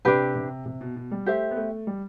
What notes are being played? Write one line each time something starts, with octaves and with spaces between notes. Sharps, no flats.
C3 D4 G4 B4
C3
C3
B2
B2
G3
A3 G4 C5 E5
B3
A3
G3